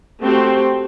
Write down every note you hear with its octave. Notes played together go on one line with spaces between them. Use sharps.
A3 C4 F#4 G4 C6